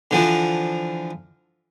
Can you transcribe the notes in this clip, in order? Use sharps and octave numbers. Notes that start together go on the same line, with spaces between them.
D3 E3 F3